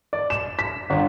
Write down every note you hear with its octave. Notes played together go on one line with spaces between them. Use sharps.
D5
E7
B6
G1